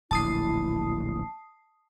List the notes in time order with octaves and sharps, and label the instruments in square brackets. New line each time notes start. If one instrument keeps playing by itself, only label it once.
[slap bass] D1 A#1 [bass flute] E4 [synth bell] A5 D#6 C7